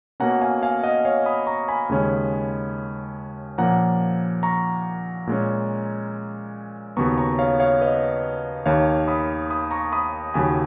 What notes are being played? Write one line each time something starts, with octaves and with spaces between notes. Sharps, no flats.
B2 A#3 C#4 F#5 A#5
F5 G#5
F5 G#5
D#5 F#5
C#5 F5
B5 D#6
A#5 C#6
G#5 B5
D#2 C#3 G#3 C#4
A#2 F3 A#3 C#4 F#5 A#5
A#5 C#6
A#2 G#3 C#4
D#2 C#3 F#3 B3 A#5 C#6
A#5 C#6
C#5 F5
C#5 F5
B4 D#5
D#2 D#3 A#3 C#5 F5
B5 D#6
B5 D#6
A#5 C#6
B5 D#6
D#2 C#3 F#3 G#5 B5